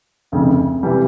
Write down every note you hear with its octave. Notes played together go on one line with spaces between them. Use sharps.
F1 F2 C#3
C3 E3 G3